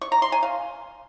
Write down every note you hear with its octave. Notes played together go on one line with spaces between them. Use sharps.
C#6
A#5
C6
G#5
F5